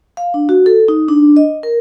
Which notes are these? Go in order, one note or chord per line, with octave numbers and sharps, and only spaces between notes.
F5
D4
F#4
A4
D#4
D4
D#5
A#4